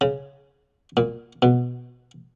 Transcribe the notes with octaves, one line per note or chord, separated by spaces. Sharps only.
C#3
A#2
B2